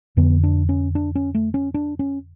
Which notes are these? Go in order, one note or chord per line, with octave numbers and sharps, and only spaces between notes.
F2 D3 B3
D4
C#4
D4
C#4
A3
C#4
D4
C#4